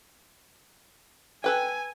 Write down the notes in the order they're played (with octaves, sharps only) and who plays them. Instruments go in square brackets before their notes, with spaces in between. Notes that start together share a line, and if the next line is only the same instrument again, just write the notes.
[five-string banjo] A4 B4 G5 [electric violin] G#5